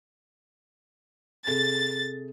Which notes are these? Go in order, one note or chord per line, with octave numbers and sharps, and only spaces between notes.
C3 G#4 A4 A6